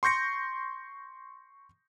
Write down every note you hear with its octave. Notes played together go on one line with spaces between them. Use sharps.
C6 C#6 G6 A#6 C#7